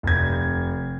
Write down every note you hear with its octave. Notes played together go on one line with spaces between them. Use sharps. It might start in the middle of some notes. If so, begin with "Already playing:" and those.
F1 G#6